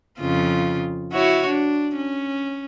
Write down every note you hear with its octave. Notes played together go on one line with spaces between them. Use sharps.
F2 C#3 F4
E4 F#4 C#5
D4
C#4